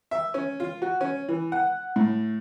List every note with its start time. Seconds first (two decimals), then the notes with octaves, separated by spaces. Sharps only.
0.11 E5
0.34 C#4
0.60 F4
0.82 F#4
1.01 C#4
1.28 E3
1.52 F#5
1.96 A2